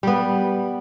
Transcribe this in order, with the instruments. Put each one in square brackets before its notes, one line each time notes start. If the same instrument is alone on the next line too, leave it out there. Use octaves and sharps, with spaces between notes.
[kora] G3 B3